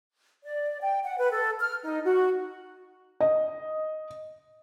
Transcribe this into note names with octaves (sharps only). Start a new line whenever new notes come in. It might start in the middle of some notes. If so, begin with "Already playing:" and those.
D5
G5
F#5
B4
A4
F6
D#4
F#4
D#5